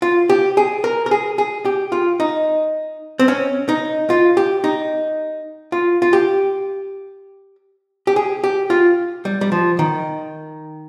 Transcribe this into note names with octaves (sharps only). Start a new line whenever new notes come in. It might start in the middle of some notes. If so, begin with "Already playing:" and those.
F4
G4
G#4
A#4
A#4
G#4
G#4
G4
F4
D#4
C4
C#4
D#4
F4
G4
D#4
F4
F4
G4
G4
G#4
G4
F4
G3
G3
F3
D#3